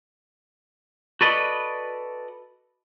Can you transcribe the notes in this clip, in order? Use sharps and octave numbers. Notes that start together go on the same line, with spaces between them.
F#4 A4 B4 D5 D#5